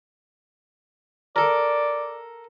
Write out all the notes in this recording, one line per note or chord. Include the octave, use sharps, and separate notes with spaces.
A4 A#4 D5